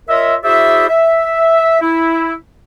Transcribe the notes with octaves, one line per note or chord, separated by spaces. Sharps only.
F4 A#4 C#5 D#5 E5
E4 F#4 G#4 C5 D5 E5
E5
E4